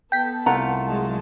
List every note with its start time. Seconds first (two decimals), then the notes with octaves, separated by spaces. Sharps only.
0.12 B3 A4 G5 B6
0.46 C2 A3 F4 F#5 A#5
0.85 F#3 G#3 A5